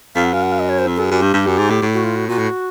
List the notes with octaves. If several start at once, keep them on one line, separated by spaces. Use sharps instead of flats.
F2 F5
F#5
F#2 F5
F#5
F5
D#5
C#5
C5
F2
F#2 A4
G#4
F#2 G4
G2
G2
F#2
G#2
A2
A2
F#4
F4
F#4
A#2 F#4
A2